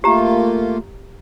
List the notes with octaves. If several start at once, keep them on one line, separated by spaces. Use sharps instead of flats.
A3 A#3 F4 G4 A#5